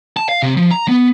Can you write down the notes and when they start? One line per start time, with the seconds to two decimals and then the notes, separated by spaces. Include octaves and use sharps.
0.17 A5
0.29 F5
0.42 C3
0.57 F3
0.71 A#5
0.89 B3